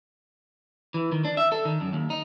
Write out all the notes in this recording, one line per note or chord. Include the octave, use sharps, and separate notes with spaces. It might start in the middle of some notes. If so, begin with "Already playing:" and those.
E3
D#3
D4
E5
A4
D#3
F#2
D#2
D#4